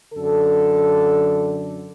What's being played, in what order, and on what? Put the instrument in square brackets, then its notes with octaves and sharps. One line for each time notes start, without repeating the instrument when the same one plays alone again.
[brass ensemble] F#2 D3 A4